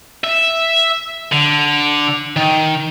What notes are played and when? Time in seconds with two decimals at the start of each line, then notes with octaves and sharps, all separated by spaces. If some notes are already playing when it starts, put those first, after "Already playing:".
0.24 E5
1.32 D3
2.36 D#3